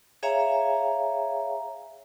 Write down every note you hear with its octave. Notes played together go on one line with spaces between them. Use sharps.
G#4 C#5 E5 F5 G#5 A#5